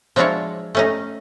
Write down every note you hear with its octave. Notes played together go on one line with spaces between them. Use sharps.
F3 F#3 G#3 D4 E4 C#5
A3 C#4 D#4